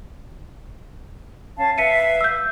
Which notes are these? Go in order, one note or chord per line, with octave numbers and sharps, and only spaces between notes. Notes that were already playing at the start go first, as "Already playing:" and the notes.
C#4 F5 A5
B4 E5 F5 B6 C#7 D#7
E6 G6